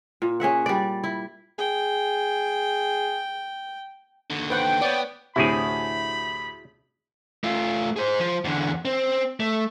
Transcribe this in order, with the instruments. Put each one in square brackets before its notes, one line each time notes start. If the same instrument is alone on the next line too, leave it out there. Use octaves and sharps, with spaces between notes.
[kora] A#2
C#4 G#4 E5 F#5
G3 D5
E4
[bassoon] G#4 [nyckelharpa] G5
[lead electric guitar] D#2 D3
[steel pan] B4 C5 F#5 [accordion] G5
[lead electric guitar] B3 [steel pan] C#5 D5
[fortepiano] D2 A2 C3 [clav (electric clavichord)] E4 F#4 G#4 [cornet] B5
[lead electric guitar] A3 F4
G#4 C5
F3
E2 D3
C4
A3